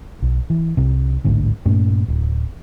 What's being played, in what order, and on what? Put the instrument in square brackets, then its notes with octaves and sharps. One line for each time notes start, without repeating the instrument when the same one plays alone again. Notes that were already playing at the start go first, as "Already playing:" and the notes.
[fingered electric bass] B1
E3
C2 C3
A1 D2 G#2 D3
G2 A#2 A3 C#4
D1